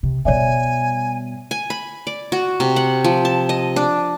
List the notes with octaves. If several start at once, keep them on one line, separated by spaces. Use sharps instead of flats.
C3
B2 G3 C#5 D5 E5 G#5
G#5
B5
D5
F#4
C3
F#5
F3
A5
D#5
D4